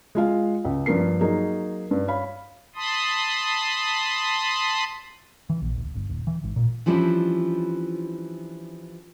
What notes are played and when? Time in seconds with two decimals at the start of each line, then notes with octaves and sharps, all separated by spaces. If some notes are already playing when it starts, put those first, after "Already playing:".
0.15 G#3 F4 F5
0.65 C#2
0.86 G2 F3 A#3 C7
1.20 F#3 A#3 D#4 G#4
1.91 G2
2.08 C#5 F5 B5
2.76 A5 B5 C6 D#6
5.50 E3
5.62 A#1
5.78 D1
5.95 G1
6.09 D#1
6.27 E3
6.44 G#1
6.56 A#2
6.86 E3 F3 G3 C#4 D4 E4